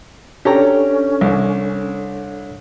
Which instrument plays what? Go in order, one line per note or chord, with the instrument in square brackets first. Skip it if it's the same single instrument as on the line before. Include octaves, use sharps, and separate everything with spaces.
[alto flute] C#4 [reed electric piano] D4 A4 C#5 [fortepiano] G4 A#5
[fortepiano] C2